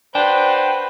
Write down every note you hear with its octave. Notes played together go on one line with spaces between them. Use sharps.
D4 F#4 B4 C5 G5